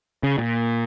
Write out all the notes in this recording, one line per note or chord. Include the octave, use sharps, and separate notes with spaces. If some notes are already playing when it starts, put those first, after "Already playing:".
C#3
A#2